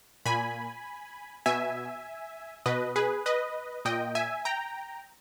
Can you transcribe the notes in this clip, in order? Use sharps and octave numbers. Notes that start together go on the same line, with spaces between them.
A#2 G#5 B5
B2 E5 G#5
B2 B4 D#5
G#4 B4
B4 D#5
A#2 D#5 G5
E5 G#5
G5 A#5